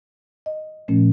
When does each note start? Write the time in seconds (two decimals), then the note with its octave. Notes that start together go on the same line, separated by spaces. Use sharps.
0.46 D#5
0.88 A#2 F3 A3 C#4